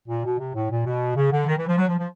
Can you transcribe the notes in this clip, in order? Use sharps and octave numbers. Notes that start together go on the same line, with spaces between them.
A#2
B2
C3
A2
A#2
B2
C#3
D3
D#3
E3
F3
F#3
F3
F3